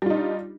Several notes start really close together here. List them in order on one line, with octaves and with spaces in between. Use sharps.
G3 F4 D#4 D4